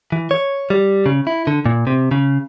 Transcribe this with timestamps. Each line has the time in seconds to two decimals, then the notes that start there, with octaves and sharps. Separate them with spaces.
0.12 E3
0.31 C#5
0.70 G3
1.06 C#3
1.27 E4
1.47 D3
1.66 A#2
1.87 C3
2.11 C#3